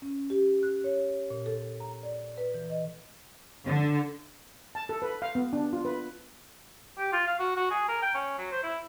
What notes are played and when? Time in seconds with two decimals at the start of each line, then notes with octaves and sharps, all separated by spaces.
0.02 C#4
0.30 G4
0.63 F#6
0.84 C#5
1.30 A#2
1.46 A4
1.80 A#5
2.03 D5
2.38 B4
2.54 E3
2.70 D#5
3.65 D3
4.75 A5
4.89 A4
5.02 B4
5.22 F5
5.35 B3
5.53 D4
5.73 F4
5.85 B4
6.98 G4
7.13 F4
7.28 F5
7.39 F#4
7.57 F#4
7.71 G#4
7.88 A#4
8.02 G5
8.15 C#4
8.38 F#3
8.52 C5
8.64 E4